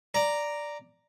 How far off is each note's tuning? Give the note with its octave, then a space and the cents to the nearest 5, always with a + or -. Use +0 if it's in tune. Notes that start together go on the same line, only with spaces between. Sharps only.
D5 +0 A#5 +0